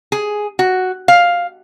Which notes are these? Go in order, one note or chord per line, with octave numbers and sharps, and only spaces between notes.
G#4
F#4
F5